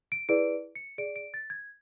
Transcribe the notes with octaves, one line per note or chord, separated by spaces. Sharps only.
D7
E4 G#4 B4 D5 D7
C#7
G#4 D5 D7
D7
A6
G#6